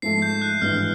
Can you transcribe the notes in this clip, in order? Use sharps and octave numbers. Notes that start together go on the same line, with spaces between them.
G#2 F3 A3 C7
G6
F#6
G#1 G2 E3 F6